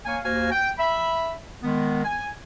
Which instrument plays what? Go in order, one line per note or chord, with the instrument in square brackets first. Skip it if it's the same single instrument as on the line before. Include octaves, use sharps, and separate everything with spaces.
[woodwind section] A#3 C#5 F5 G#5
D#2 A#3 F#4 C5 F5 G#5
G5
E5 B5
D#3 G#3 B3
G#5